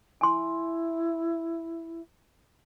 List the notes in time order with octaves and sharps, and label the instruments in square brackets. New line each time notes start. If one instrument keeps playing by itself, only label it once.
[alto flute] E4 [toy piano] G#5 C6